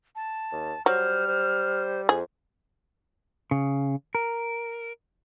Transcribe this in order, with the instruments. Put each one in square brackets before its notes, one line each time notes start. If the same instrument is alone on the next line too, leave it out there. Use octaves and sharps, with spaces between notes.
[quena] A5
[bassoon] D#2
[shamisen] F#3 [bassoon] G3 [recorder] C5 [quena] F6
[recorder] C5
[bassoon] F2 [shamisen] G#4
[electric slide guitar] C#3
A#4